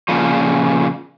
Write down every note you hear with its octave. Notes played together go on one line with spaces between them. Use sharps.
A#2 C#3 F3